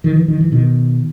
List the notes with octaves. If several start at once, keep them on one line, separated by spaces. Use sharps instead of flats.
D#3
E3
D#3
E3
B2 D#3